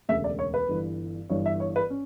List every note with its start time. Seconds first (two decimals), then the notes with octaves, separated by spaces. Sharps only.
0.09 E1 D2 C#3 E5
0.24 D5
0.39 C#5
0.54 B4
0.69 G1 G2 E3
1.30 G1 G2 E3 C#5
1.46 E5
1.60 C#5
1.76 B4
1.90 C#4